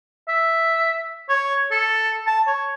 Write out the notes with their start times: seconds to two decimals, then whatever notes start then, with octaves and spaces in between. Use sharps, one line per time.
0.28 E5
1.29 C#5
1.71 A4
2.27 A5
2.47 C#5